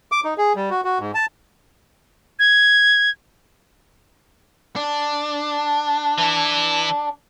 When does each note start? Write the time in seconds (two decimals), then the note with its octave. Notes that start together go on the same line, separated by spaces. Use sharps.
0.12 D6
0.25 D#4
0.38 G#4
0.56 G3
0.70 F#4
0.84 F#4
1.00 G#2
1.15 A5
2.39 G#6
4.76 D4
6.19 E3 E4